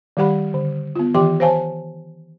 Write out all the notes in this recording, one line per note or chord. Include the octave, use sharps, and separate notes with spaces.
D#3 G3 G4 F#5 B5
D3
B3 F4
D#3 E3 G4 G5 C6 D6
C5 C#5 F5 G#5 A5